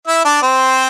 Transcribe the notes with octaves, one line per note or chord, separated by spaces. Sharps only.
E4 E5
D4 D5
C4 C5